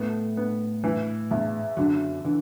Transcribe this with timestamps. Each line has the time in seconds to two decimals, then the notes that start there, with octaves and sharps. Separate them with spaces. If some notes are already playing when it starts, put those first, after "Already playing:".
Already playing: A2 A3 B3
0.37 B3
0.84 E3
1.31 E2
1.77 F#2 D3 F#3
2.24 D3 E3